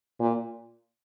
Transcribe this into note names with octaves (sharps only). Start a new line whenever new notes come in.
A#2